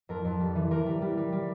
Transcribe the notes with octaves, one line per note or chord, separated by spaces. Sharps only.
F2 A#4
F2
G3
E3
E3 A#4
G3
G3
G3
G3